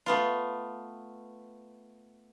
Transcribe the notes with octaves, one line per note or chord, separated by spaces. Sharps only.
A3 B3 F4